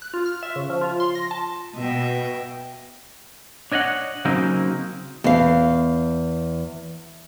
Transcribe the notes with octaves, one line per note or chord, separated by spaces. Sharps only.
F#6
F4
F6
E5
C#3
F3
F4
C6
A#6
A5
B2 D#5 E5 G5
D4 C#5 D#5 F5 F#5
C#3 F#3 A#3 C4 D#4
E2 F5